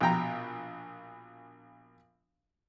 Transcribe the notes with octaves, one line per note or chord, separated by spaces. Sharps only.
A#1 B2 G5 A#5